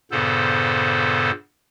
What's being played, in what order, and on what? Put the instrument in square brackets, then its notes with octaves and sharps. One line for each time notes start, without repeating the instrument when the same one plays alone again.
[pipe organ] G2 A#2 C#3 B3 A4 C5